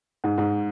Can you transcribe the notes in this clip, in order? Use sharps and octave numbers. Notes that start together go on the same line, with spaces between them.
G#2
G#2